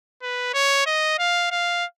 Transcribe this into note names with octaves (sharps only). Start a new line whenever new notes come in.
B4
C#5
D#5
F5
F5